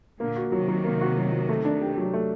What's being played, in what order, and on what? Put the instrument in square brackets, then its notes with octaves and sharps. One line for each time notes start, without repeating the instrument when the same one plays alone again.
[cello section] A#2 D3 [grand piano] A#3
[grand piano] F#4
[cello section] C3 D#3 [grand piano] F#3
[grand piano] F#3
A#3
F#4
F#3
F#3
A3
D4
G4
F#3
A3